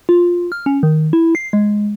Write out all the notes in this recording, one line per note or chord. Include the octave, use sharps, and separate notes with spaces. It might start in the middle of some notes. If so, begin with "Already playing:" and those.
F4
F6
C#4
D#3
E4
C7
G#3